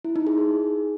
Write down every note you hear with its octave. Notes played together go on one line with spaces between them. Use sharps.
E4
D#4
G#4
G#4